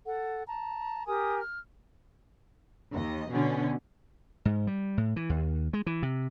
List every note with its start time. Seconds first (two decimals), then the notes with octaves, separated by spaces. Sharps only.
0.06 A4 F#5
0.47 A5 A#5
1.07 G4 A#4 G#5 D#6
1.41 F6
2.92 D#2 D#5
3.31 B2 D3 C#4
4.45 G#2
4.67 G3
4.98 A2
5.16 E3
5.30 D#2
5.73 G#3
5.86 E3
6.03 C3